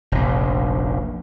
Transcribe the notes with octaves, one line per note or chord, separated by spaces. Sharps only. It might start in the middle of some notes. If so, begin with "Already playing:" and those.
F1 A#1